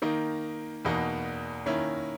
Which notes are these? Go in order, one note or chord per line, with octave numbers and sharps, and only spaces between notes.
D#3 A#3 D#4
E2 B2 A#3 D#4 F#4
D#3 A#3 C#4 E4